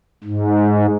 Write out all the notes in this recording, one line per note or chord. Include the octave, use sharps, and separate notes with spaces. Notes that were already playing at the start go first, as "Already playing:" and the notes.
G#2